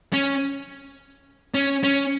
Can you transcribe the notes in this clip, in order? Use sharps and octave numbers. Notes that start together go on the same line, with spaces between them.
C#4
C#4
C#4